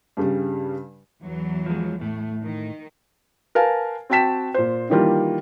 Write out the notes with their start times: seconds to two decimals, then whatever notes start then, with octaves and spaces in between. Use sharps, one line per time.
0.17 G2 C#3 G3
1.23 E2 E3 F#3
1.66 F3 G#3
2.01 A2 A3
2.43 D#3
3.55 A#4 B4 F5 G#5 A5
4.10 C4 F#4 G5 A5 B6 E7
4.54 A#2 C5
4.90 D#3 E3 G3 A#3 F4 G4